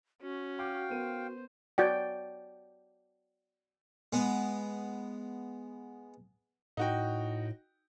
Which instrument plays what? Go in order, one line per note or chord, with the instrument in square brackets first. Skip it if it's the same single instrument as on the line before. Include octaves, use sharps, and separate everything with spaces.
[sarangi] C#4 [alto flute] F#4
[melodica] F5 G5 [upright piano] D6
[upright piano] B3 A#4 D#7 [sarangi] C5
[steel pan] F#4 D5 G5
[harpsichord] G#3 B3
[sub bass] A2 [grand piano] D#4 F#4 G5